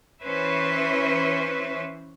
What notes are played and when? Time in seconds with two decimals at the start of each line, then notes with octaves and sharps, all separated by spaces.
0.21 E3 C#4 B4 C5 E5